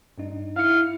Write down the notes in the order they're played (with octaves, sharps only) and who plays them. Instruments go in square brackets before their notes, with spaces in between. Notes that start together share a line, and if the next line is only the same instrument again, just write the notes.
[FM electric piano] G2 D4 D#4
[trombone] E4 [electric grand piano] F5 C#7 [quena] F6